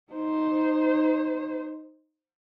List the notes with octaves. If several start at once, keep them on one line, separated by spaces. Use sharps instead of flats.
D#4 C5